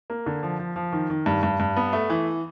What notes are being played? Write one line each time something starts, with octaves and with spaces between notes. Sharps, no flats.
A#3
D3
F3
F3
F3
D#3
D#3
G2
G2
G2
B3
A3
E3